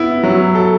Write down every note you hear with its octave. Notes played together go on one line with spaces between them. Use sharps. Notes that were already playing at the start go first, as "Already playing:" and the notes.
Already playing: B3 E4
F#3
A4